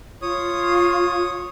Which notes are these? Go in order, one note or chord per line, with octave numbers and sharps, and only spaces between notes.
F4 C#5 D#6